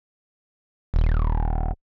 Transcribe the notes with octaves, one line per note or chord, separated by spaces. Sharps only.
D#1